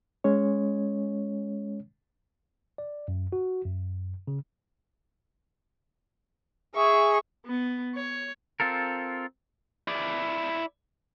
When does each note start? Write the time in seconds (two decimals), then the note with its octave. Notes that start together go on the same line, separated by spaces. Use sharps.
0.24 G#3 C#4 C#5
2.78 D5
3.08 F#2
3.32 F#4
3.65 F#2
4.27 C#3
6.75 G#4 E5 C#6
7.46 B3
7.95 C#5
8.60 C4 F4 A4 A#4
9.88 E4 D5